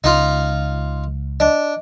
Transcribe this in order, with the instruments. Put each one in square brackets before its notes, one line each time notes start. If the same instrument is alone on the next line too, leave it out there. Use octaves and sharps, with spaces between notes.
[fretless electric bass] C#2 [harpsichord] D#4 F4
[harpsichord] D4 [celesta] D#5